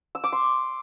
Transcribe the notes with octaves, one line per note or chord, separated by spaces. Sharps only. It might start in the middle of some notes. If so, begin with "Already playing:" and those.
E6
D6
C6